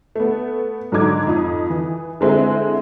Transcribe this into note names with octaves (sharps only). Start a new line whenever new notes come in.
A3 B3
G#2 D3 F#3 D#4 D6 G#6
F2 D#4 D#6
E3
D3 G#3 C4 E4